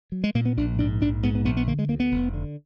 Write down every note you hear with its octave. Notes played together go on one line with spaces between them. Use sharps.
F#3
G#3
A#2 A#3
B3
A#1 D4
G#2 D4
A#1 D4
G#2 B3
B3
A#1 B3
B3
D3 A#3
G#3
D2 A#3
B3
F1
D3